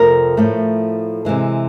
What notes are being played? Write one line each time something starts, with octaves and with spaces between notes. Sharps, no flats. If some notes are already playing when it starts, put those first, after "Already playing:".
Already playing: F2 C3 F3 A3 A#4
A2 F3 A3
C3 E3 G#3